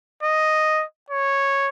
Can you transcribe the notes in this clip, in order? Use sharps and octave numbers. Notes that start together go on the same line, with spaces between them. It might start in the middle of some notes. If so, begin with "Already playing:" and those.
D#5
C#5